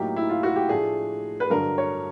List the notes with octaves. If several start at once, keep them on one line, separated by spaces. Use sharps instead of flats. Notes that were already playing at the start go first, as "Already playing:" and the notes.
Already playing: A2 F#3 A#3 D#4 G4
E4
F4
F#4
G4
A2 F3 A3 D4 G#4
B4
G2 D3 F#3 A#4
C#5